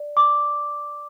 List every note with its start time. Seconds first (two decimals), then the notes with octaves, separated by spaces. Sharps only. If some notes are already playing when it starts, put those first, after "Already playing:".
Already playing: D5
0.17 D6